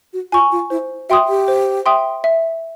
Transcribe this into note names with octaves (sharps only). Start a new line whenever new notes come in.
F#4
F4 G#5 C#6
F4
E4 C5
F#4 E5 G5 C6 D#6
G4
C5
E5 G5 C6 D#6
E5